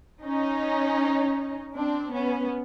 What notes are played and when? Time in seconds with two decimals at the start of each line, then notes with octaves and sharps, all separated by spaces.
0.24 C#4 D#4
1.75 C4 D4
2.12 B3 C#4